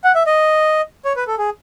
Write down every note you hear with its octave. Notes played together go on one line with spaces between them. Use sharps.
F#5
E5
D#5
C#5
B4
A4
G#4